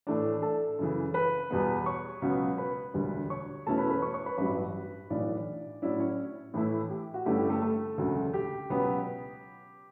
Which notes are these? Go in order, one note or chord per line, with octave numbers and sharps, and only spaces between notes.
A2 E3 A3 D4 D5
A4 A5
F#2 C#3 E3
B4 B5
E2 B2 G3 B3
C#5 C#6
C#2 B2 F#3 B3
B4 B5
E1 D2 D3 G3
C#5 C#6
E2 B2 A3 C#4 E4 A4 A5
B4 B5
B4 B5
C#5 C#6
C#5 C#6
B4 B5
A1 G2 F#3 B4 B5
B1 A2 E3 D4 D5
A2 F#3 C#4 D4 E4 D5
C#4 C#5
A2 E3 A3 E4
G4
F#4
G2 D3 A3 C#4 E4 G4
G4
A3 A4
A3 A4
E1 D2 C#3 F#3
G4
C#2 B2 F#3 B3